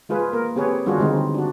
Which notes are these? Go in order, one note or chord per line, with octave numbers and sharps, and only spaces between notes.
G#3 F4 G#4 B4
A#3 A#4
C4 G4 G#4 B4 C#5
D#3 G3 D4 F4 F#4 G#4
D3 G#3 C4 D#4
D4 F#4